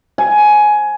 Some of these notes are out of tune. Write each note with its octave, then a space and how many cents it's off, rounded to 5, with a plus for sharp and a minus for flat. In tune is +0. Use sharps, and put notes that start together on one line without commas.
G#5 +15